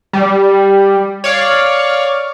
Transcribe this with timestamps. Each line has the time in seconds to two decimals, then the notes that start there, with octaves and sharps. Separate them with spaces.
0.13 G3
1.24 C#5 D5 F5